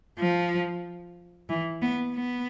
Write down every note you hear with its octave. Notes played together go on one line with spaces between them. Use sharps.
F3
E3
B3
B3